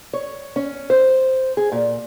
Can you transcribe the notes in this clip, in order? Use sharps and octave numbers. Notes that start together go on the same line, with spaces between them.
C#5
C#4
C5
G#4
A#2